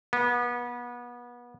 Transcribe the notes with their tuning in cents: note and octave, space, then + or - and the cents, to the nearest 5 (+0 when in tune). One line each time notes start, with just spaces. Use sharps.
B3 -30